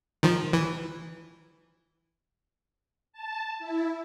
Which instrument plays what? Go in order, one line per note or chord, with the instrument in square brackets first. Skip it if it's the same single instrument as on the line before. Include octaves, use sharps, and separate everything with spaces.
[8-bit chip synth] D#3 F3
E3
[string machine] A5
E4